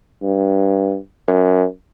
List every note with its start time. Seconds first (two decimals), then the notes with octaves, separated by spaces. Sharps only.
0.23 G2
1.28 F#2